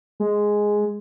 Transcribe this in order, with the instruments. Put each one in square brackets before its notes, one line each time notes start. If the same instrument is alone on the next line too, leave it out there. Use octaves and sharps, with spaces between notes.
[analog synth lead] G#3